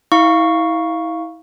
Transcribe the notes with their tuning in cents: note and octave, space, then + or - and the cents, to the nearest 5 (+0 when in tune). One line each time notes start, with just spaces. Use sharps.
E4 -35 F5 +0 C#6 +0